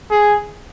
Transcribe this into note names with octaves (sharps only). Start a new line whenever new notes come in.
G#4